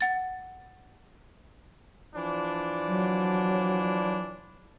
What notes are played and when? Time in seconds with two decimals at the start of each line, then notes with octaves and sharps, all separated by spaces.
0.01 F#5 A6
2.15 E3 F3 D4
2.87 F#3